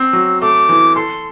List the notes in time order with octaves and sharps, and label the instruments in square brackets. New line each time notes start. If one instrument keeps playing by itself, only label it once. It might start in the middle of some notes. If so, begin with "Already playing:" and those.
Already playing: [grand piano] C4 [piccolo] E6
[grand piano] F#3
[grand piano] A3 [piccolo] D6
[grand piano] E3
[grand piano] A4 [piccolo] C6